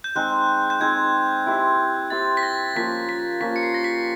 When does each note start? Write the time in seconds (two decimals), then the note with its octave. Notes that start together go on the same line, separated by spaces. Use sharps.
0.04 G6
0.15 G#3 C4 D#4 G#4 F#6
0.70 G6
0.80 G#3 C4 D#4 G#4 G#6
1.46 E4 G4 C5
2.10 E4 G4 C5 A6
2.37 B6
2.43 A#6
2.75 F3 A#3 C#4 B6
3.09 B6
3.40 F3 A#3 C#4 B6
3.56 C#7
3.63 C7
3.74 A#6
3.84 B6